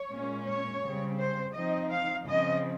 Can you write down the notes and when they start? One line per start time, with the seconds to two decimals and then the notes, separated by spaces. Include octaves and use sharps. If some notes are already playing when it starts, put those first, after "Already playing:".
Already playing: C#5
0.11 A#2 G#3 C#4
0.47 C#5
0.83 C#3 G3 C4
1.19 C5
1.54 F3 C4 D#4 D#5
1.91 F5
2.26 C#3 F3 C4 D#5